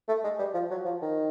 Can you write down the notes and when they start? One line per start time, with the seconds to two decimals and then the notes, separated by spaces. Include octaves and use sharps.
0.08 A3
0.24 G#3
0.39 G3
0.54 F3
0.71 F#3
0.85 F3
1.02 D#3